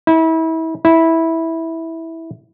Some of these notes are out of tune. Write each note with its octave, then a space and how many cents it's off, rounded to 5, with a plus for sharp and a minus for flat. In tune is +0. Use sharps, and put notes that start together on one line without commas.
E4 -30
E4 -10